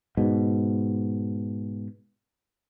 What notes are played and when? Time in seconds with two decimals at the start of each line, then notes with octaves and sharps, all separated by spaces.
0.17 G#2 B2